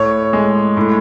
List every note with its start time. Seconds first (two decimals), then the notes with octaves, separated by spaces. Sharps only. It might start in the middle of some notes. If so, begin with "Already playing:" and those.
Already playing: A2 C#5
0.33 G#3
0.77 A2